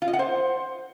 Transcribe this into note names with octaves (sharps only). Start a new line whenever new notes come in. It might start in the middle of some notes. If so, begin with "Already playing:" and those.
F4
D#5
F#5
C5